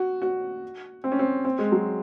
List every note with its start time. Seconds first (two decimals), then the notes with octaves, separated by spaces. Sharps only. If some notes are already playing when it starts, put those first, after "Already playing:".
Already playing: F#4
0.22 F#4
1.04 C4
1.12 C#4
1.19 C4
1.45 C4
1.59 G#3
1.72 F#3